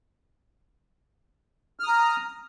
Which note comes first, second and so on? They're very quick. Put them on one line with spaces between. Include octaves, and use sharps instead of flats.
F6 D#6 A#5